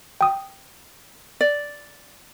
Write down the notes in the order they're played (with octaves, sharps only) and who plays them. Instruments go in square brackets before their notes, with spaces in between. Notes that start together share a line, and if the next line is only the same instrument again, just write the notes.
[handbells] G5 D#6
[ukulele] D5